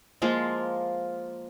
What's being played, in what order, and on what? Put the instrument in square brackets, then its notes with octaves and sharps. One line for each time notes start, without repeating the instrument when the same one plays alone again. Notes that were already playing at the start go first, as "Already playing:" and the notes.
[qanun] F3 G#3 A#3 F4